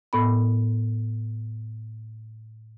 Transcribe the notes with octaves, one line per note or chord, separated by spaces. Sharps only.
A2 B3 B5